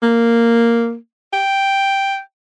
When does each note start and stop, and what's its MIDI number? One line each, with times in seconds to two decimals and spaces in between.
0.03 0.95 58
1.33 2.19 79